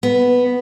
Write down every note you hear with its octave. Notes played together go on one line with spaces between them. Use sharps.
B3